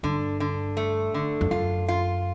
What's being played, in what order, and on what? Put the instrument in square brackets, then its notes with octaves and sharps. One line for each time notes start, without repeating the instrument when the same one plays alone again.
[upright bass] G2 [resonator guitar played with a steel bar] D3
[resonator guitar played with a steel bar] D3
A3
D3
[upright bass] F2
[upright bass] F#2 [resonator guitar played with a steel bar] F4
[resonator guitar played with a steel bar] F4